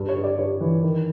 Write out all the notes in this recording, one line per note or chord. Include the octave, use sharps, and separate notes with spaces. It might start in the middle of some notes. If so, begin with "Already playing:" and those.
Already playing: G2
C#5
G2
D5
G2 C#5
E3
D#3